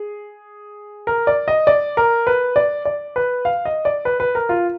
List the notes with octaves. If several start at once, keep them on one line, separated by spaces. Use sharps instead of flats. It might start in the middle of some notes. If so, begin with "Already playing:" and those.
Already playing: G#4
A#4
D5
D#5
D5
A#4
B4
D5
D5
B4
F5
D#5
D5
B4
B4
A#4
F4